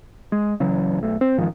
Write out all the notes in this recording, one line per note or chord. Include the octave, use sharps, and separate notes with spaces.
G#3
C#3 E3 F#3
B1 A3
C4
A1 G#2 D#3 F3